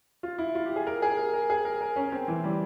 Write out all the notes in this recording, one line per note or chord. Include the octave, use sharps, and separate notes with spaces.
F4
E4
F4
G4
G#4
A#4
G#4
A#4
A#4
G#4
A#4
A#4
C#4
C4
E3
G3